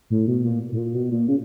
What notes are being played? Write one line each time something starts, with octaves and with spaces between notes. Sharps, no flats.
A2
B2
A#2
A2
A#2
B2
A#2
C#3